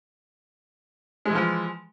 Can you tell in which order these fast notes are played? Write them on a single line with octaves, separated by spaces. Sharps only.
G#3 E3 F3